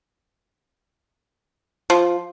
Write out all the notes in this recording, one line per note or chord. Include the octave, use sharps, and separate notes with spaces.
F3